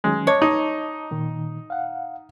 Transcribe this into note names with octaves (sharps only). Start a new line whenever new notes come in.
D#3 F#3 G#3 C#4
C#5 D#5 A5 D6
D#4
A#2 D#3
F5 F#5